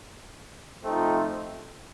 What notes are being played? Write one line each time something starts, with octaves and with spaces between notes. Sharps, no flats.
C3 F3 A3 C4 D#4